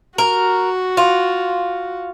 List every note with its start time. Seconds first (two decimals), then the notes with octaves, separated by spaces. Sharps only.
0.18 F#4 A#4
0.97 F4